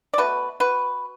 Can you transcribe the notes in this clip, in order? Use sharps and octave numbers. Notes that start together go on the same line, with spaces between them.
D5
B2 A3 F#4 B4
F#4 B4